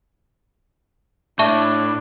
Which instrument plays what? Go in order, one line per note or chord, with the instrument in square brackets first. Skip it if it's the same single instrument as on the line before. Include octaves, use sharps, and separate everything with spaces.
[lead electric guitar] A2 [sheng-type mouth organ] D4 [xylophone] E5 A5 C#6